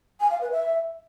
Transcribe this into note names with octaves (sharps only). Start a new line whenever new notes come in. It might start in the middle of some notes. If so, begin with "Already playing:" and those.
G#5
F5
B4
E5